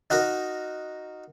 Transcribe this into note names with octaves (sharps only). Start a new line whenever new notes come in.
D#4 F#4 A#4 B5